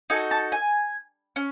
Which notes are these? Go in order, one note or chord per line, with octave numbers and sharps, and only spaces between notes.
D#4 F#4 A4 G#5
A5
G#5
C#4